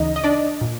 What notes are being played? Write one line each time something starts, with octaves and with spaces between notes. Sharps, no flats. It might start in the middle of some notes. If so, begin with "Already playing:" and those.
Already playing: D2 C#3 E3 D#4 D#5
D#5
D4 D5
A#2